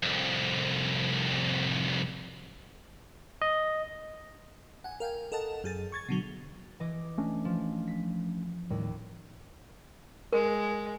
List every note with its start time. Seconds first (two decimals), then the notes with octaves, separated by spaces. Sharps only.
0.03 C2 F2
3.42 D#5
4.84 F#5 G#5
5.00 A#4 F5 G5 G#5
5.32 A4 A#4 D#5 F#5 A5
5.64 F#2 G#4 A6
5.92 C#6 G#6 A6
6.09 B2 D3 F#3
6.80 E3 D#5 D6
7.18 A3 C#4 D4
7.45 F3
7.88 B6
8.70 D#2 A2 D#3 G3
10.33 G#3 A#4